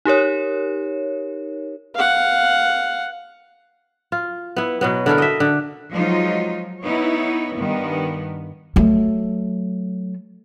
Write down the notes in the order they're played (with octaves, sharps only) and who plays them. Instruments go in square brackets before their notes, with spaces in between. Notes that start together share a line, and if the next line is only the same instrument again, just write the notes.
[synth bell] D#4 G4 A#4 C#5
[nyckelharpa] F5 F#5
[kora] F4
B3 E4
B2 F#3 B3
D3 E4 A4 A#4
D#5 E5
D3
[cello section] F3 F#3 G#3 D#4 F4
B3 D#4 E4 C#5
G2 D#3 B3
[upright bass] F#3 A3